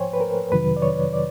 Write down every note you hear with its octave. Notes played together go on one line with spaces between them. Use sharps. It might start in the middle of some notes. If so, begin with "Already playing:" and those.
Already playing: G#2 F3 C5 C#5 G5 G#5
B4
A#4
F2 C3 D#3 F#3 B4
D5
C#5
D5